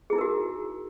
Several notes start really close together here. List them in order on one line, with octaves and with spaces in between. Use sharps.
G#4 E4 D#4 A#4 F#4